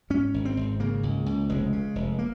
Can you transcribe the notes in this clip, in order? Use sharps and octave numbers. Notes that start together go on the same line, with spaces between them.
G#2 C#4
G#1
C4
G#1
C#3 A#3
C#2
C#2
F1 G#3
C#3
F1
A#3